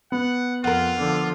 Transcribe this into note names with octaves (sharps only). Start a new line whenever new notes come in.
B3 F#5
F2 F4 A#4 F#5
D3 F3